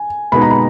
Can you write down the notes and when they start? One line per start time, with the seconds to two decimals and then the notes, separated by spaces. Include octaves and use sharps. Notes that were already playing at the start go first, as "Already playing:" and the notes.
Already playing: G#5
0.32 B2 G#3 B3 D#4 B5
0.41 A#5
0.50 B5